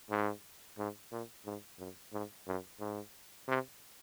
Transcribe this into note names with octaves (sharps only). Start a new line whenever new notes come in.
G#2
G#2
A#2
G#2
F#2
G#2
F#2
G#2
C3